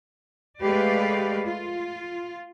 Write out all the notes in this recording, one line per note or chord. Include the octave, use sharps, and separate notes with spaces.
G#3 A3 G4 B4 D5 F5
F4